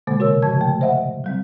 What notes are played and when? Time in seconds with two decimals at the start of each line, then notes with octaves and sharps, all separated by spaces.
0.07 B2 D3 G#3 A#3
0.19 C3 F#4 A#4 C#5 E6
0.42 G#2 C#3 F3 A5 G#6
0.61 A3
0.81 C5 D#5 E5 F#5
1.24 F#3 G3 C4